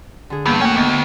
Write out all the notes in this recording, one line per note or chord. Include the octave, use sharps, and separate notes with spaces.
D3 G#4
E2 G2 A#3 G6
A2 A#3 C#4 F#4 G5
D2 B3 D#5